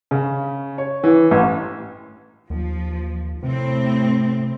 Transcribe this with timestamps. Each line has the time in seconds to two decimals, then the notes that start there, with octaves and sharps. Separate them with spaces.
0.11 C#3
0.78 C#5
1.04 E3
1.31 A1
2.50 D#2 F3
3.43 A2 C3 C4